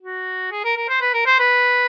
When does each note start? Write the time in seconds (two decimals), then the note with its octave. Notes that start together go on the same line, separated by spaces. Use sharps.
0.01 F#4
0.51 G#4
0.64 A#4
0.77 A#4
0.89 C5
1.01 B4
1.14 A#4
1.26 C5
1.39 B4